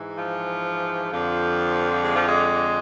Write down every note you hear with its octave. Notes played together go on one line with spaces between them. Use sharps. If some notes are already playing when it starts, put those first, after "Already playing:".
Already playing: G#2 E3
F3
F2 D3 F3
G#3
F3
G#3